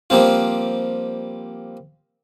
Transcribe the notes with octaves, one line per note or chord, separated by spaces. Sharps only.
F3 G3 A#3 C4 F4